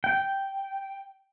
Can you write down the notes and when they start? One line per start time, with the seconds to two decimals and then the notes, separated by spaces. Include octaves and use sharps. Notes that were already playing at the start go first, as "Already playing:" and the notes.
0.04 G5